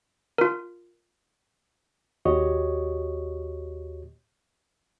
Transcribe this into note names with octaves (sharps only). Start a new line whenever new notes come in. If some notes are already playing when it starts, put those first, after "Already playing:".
F4 A#4
D#2 F#4 G4 C#5 D#5 C#6